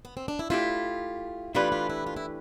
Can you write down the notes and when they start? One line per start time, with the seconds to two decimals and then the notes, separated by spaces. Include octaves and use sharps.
0.05 B3
0.17 C4
0.28 D4
0.39 E4
0.50 A3 E4 F4 G4
1.54 E3 A3 D4 F4 G4 B4
1.72 F4
1.90 E4
2.07 F4
2.16 E4